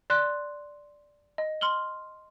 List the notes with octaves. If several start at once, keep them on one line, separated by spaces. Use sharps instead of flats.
D5 C6 F#6
D#5
C6 F6 F#7 G7